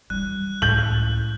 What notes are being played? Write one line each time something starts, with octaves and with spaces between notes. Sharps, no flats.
E3 G3 F#6
C#2 A2 G6 F#7